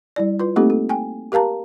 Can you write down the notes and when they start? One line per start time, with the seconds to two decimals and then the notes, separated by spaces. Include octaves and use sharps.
0.16 G3 E4 D5
0.39 F4 B4
0.56 A3 A#3 C4 D#4 G4 A4
0.70 A4
0.89 G5 G#5
1.32 G4 A#4 F5 A5 A#5